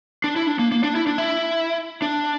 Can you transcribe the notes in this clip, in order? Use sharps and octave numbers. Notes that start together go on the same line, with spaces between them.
D4
E4
D4
A#3
A#3
D4
E4
D4
E4
D4